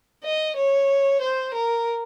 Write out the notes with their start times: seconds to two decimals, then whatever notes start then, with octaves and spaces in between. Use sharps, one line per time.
0.24 D#5
0.56 C#5
1.21 C5
1.54 A#4